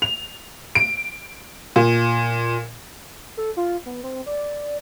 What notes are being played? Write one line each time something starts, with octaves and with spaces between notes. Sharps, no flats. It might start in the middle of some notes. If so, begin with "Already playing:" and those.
F7
D7
A#2
A4
F4
B3
C4
D5